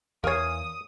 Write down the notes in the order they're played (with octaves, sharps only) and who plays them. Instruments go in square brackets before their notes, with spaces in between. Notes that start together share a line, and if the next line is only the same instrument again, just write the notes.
[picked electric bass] E2 [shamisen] A#4 C#5 [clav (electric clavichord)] F5 G#5 [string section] D#6